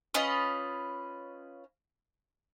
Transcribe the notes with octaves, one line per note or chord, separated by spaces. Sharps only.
C#4 F4 B4 D#5